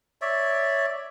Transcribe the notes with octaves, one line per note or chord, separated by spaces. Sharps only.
C#5 D5 E5